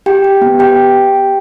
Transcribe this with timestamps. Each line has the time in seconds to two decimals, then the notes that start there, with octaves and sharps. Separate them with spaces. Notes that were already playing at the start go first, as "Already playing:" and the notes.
0.06 G4 G5
0.24 G4
0.41 B3
0.59 B3 G4 G5